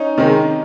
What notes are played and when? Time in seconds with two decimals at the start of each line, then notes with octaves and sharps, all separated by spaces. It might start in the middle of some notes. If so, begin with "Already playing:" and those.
Already playing: C#4 D#4
0.17 C3 D#3 G#3